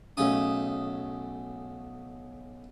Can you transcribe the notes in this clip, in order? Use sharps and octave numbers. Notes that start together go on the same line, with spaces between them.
B1 C#3 A3 C#4 D#6